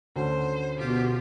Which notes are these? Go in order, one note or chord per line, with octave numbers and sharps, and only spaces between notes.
D2 D3 C#4 C5
B2 F4 G4